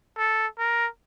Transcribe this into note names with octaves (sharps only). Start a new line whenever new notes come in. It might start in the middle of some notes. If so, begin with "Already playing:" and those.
A4
A#4